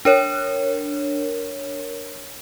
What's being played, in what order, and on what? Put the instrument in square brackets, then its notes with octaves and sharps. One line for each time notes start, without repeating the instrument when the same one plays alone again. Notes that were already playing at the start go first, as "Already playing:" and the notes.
[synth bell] D4 A#4 C#5